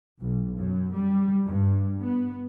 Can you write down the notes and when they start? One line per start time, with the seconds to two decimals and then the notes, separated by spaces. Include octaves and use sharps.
0.20 B1
0.56 F#2
0.94 G3
1.47 G2
2.00 B3